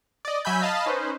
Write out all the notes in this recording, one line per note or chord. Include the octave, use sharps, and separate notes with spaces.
D5 D#5
F#3 E5 G#5 B5 G6
D#5 F5 A5 B5
C#4 D#4 B4 C5